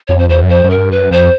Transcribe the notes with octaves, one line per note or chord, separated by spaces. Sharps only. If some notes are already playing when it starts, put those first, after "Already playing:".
F2 C#5
C5
E2 C5
F#2
F2 C5
F#2
A#4
G2
F#2 B4
F2 C5